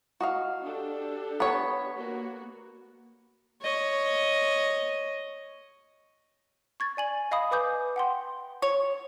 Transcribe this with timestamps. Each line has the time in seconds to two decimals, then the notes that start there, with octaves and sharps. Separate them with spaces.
0.20 F#4 D#5 F5
0.66 D4 G4 A4
1.40 B3 C#5
1.96 A#3 F#4
3.62 C#5 D#5
6.80 C#6 G#6 A6
6.97 D5 G#5 F#7
7.31 D#5 F5 B5 D#6
7.51 B4 G#5 D6 D#6 G6
7.96 F#5 G5 C6
8.62 C#5